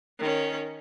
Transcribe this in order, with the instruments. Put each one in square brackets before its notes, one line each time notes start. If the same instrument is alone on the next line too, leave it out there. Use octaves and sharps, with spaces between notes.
[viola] D#3 C#4